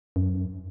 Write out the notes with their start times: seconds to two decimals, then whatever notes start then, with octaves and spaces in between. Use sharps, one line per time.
0.16 F#2